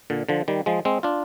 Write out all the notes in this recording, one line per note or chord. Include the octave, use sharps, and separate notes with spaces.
A#2 D3
D3 F3
D#3 G3
F3 G#3
G#3 C4
D4 F4